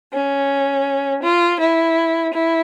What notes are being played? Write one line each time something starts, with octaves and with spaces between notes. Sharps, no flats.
C#4
F4
E4
E4